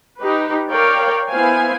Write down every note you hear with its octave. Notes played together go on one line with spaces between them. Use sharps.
D#4 G4 B4
A#4 C#5 D5 F5 G5
B3 E4 C5 F5 G#5